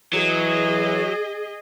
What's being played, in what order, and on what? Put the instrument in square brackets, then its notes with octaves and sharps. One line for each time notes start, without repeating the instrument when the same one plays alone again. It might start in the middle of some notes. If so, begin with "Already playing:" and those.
[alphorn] E3 [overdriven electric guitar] F#3 [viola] G#4 D#5